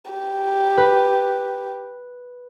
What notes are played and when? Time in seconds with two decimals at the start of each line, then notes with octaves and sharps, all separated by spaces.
0.11 G4
0.77 B4